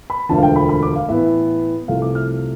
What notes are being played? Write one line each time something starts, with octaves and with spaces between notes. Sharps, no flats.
B5
E1 D2 D3 F3 A5
F5
G5
B5
B5
D6
F5
A2 E3 B3 E5
C2 C3 F3 A3 F5
D6
F6